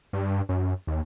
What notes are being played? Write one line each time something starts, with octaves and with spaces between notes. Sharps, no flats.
G2
F#2
D#2